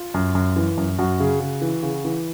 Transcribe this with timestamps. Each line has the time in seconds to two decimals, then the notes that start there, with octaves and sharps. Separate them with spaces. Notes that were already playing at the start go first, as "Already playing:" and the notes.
Already playing: F4
0.14 F#2
0.35 F#2
0.56 E3
0.77 F#2
0.99 F#2 F#4
1.20 C#3
1.40 C#3
1.62 E3
1.83 C#3
2.05 E3